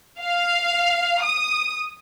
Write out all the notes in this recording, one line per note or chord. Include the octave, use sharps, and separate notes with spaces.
F5
D#6